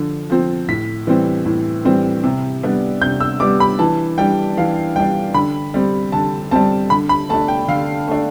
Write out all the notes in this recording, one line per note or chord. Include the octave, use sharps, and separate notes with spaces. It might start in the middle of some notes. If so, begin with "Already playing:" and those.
Already playing: D3 F3
F3 C4
A2 B6
E3 G3 C4
A2
E3 G3 C4
C3
G3 B3 D4
C3 G6
E6
G3 B3 D4 D6
B5
E3 A5
G3 D4 G5
E3 F5
G3 D4 G5
D3 B5
G3 C4
D3 A5
G3 C4 A5
D3 B5
B5
A3 D4 A5
G5
D3 F5
A3 D4